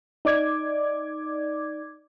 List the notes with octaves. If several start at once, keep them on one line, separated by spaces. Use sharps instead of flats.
D#4 D5 D6 G#6